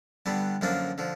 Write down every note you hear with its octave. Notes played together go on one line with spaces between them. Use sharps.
G2 D3 G3 B3
F#2 D3 F3 A#3 D4
D3 F3